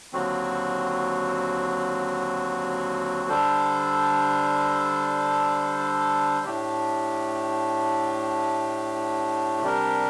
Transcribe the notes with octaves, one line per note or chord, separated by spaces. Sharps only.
D#2 D3 F#3 C4 F#4
D3 G3 D4 A4 C5
A2 A3 D4 G4
C3 G3 D4 G4 A#4